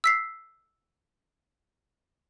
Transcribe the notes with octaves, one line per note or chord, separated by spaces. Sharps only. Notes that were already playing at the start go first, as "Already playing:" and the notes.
E6 B6 C7